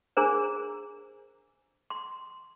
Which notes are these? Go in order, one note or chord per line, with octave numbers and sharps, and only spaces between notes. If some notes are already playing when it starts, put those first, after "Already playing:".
D4 G#4 A#4 C5 A#5
C6